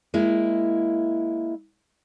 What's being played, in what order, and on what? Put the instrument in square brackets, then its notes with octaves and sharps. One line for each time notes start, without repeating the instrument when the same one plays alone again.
[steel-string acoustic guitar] G#3 A#3 E4